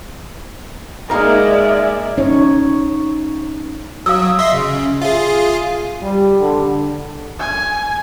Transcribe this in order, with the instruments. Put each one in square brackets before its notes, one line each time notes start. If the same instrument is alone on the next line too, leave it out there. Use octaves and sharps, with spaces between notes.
[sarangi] G#3 [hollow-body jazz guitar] A#3 D#4 A#4 [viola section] D5 E5
[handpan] C#4 D#4 C#5
[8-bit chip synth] F#3 [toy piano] F5 D#6 E6
[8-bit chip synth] D#5 E5 C6
C#3
[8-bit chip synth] F4 G#4 [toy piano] E5
[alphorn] G3
D3
[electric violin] G#5